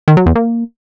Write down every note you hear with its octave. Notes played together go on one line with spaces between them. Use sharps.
D#3
F#3
E2
A#3